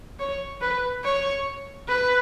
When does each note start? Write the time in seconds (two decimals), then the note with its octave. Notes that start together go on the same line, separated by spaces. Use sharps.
0.19 C#5
0.61 B4
1.04 C#5
1.88 B4